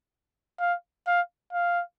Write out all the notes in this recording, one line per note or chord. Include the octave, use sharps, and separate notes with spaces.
F5
F5
F5